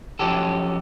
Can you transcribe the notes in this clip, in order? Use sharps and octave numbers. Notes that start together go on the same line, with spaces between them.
F3 F#3 C#4 G4 A4